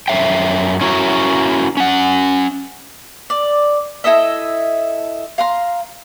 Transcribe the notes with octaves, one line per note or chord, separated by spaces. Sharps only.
F#2 E5 G5
C#4 E4 F#4 A#4
C#4 F#5
D5
E4 A4 D#5 E5
F5 A#5 C6